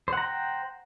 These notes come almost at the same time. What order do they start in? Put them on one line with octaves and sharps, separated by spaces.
C5 F#5 A#5 G5